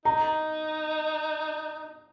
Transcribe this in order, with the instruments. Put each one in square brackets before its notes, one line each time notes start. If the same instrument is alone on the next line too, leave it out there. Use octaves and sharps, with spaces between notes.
[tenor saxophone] D#4 [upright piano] A#5